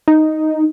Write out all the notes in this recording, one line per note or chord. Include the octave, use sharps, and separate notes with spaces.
D#4